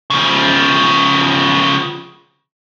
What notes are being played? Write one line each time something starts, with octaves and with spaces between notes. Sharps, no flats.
C#3 F3